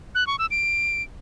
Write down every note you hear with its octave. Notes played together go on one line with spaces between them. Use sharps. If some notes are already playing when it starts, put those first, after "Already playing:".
F#6
C#6
E6
D7